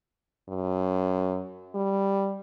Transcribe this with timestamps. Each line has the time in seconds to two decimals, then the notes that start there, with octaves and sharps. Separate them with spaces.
0.49 F#2
1.75 G3